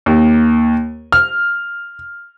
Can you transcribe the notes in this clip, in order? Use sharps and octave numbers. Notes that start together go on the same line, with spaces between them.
D#2
F6